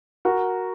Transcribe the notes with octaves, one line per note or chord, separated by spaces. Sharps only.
F#4 A#4